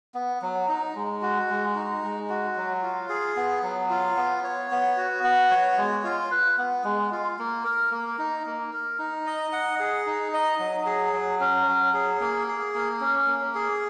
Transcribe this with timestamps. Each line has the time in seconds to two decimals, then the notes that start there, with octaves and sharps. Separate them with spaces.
0.14 B3
0.42 F#3
0.69 D#4
0.95 G#3
1.22 F#4
1.50 G#3
1.75 D#4
2.03 G#3
2.29 F#4
2.56 F#3
2.83 F4
3.09 G#4
3.36 B3
3.63 F#3
3.90 F4
4.17 B3
4.44 C#5
4.71 B3
4.97 F#4
5.24 B3
5.51 C#5
5.78 G#3
6.04 F4
6.31 B4
6.58 B3
6.84 G#3
7.11 F4
7.39 A#3
7.65 A#4
7.91 A#3
8.18 D#4
8.46 A#3
8.73 A#4
8.98 D#4
9.26 D#5
9.52 F#5
9.80 G#4
10.06 D#4
10.34 D#5
10.59 F#3
10.86 G#4
11.13 F#3
11.40 C#4
11.67 F#3
11.94 G#4
12.21 A#3
12.48 G#4
12.74 A#3
13.01 C#4
13.27 A#3
13.55 G#4